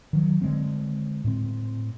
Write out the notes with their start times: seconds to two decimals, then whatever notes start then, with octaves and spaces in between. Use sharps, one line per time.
0.13 D#3 F#3
0.41 D3 G#3 C4
1.24 A2 C4